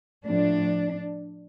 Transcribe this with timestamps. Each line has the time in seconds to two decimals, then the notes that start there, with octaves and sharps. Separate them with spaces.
0.25 A2 F3 D4